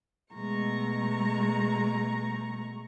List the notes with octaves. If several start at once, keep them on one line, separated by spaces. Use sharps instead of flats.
B2 G#3 A3 A#5 C#6